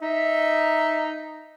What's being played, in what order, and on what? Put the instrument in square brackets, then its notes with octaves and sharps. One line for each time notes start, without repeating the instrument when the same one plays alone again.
[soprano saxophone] D#4 [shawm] E5